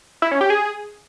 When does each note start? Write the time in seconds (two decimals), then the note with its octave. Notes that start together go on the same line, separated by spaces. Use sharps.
0.22 E4
0.31 C#4
0.41 G4
0.50 G#4